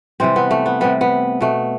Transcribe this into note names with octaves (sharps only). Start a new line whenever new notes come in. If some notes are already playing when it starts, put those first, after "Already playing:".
C3 E3 G3 C4
B3
A3
B3
C3 G3 B3
B3
B2 A3